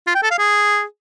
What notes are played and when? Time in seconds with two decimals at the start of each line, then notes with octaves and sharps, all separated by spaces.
0.07 F4
0.15 G5
0.23 A4
0.31 F5
0.39 G#4